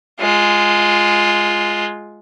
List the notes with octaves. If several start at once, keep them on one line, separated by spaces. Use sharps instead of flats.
G#3 F4